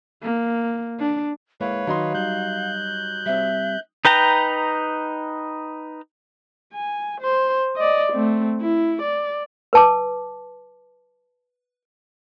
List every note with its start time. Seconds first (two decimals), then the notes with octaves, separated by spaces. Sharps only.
0.23 A#3
1.00 D4
1.61 G#3 A#3 E4 B4 C#5 F5
1.87 D#3 F#3 D#4 C6
2.14 G3 F#6 G6
3.26 G3 C4 E5
4.05 D#4 B4 G5 A#5
6.73 G#5
7.21 C5
7.76 D5 D#5
8.13 A3 C4
8.61 E4
9.02 D5
9.73 B4 A5 D6